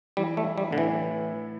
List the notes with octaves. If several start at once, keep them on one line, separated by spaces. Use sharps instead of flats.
E3 G3
A3
E4
G3
A2 D3
E3